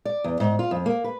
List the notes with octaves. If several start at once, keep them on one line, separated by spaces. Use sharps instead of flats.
D5
E2
G#2
F4
F2
A#3
B4